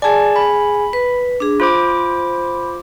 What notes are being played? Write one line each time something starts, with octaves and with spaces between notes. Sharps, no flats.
G#4 D5 G#5 A5
B5
B4
D4 G#4
F4 C5 B5 D6